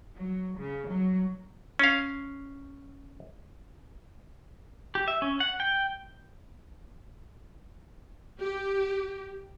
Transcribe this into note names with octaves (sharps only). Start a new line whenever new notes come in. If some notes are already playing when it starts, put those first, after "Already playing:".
F#3
C#3
F#3
C#4 F5
G4
E5
C#4
F#5
G5
G4